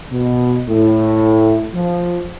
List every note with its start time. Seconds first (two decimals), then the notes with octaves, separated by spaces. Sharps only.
0.11 B2
0.68 A2
1.74 F3